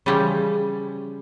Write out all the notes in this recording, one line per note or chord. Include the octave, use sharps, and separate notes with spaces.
C#3 E3 F3 G3 C#4